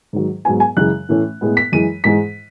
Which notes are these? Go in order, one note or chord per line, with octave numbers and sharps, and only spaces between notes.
G#2 D#3 F#3
G#2 F#3 B3 G#5
G#5
F#2 C#3 E3 G#3 F#6
A2 E3 A3 C#4
A2 G#3 B3
B6
F#2 E3 G#3 D#7
G#2 E3 G#3 B6